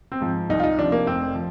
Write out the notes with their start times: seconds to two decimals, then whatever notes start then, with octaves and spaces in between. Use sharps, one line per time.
0.12 C4
0.20 G#2 F3
0.49 C2 D#4
0.60 F4
0.63 D#4
0.79 C3 F3 D4
0.92 A#3
1.07 F1 C4
1.35 F3